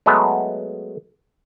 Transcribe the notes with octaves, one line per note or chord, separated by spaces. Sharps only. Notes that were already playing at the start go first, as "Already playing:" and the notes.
F#3 G#3 A3 B3